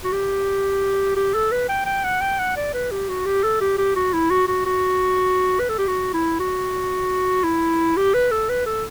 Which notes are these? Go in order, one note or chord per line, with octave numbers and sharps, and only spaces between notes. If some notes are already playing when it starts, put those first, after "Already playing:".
F#4
G4
G4
A4
B4
G5
G5
F#5
G5
F#5
D5
B4
G4
F#4
G4
A4
G4
G4
F#4
E4
F#4
F#4
F#4
B4
A4
G4
F#4
E4
F#4
E4
G4
B4
A4
B4
A4